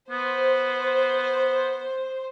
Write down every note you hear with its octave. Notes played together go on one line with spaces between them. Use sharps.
B3 C5